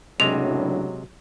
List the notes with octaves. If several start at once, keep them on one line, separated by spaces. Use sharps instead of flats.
F#1 A2 C3 F#3 G#3 D4 F7